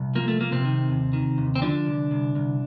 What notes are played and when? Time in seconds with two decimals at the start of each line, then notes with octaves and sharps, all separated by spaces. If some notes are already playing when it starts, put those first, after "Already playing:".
Already playing: C2
0.15 F3 A#3
0.28 A3
0.40 F3 A#3
0.52 C3 C4
0.65 D#3
0.89 D#2
1.13 D#3
1.38 D#2
1.55 C4
1.62 D3 F3 D4
1.86 C2
2.11 C2
2.35 C2